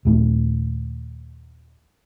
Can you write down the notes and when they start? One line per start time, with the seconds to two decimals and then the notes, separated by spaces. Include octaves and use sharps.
0.05 D#2 A#2 A3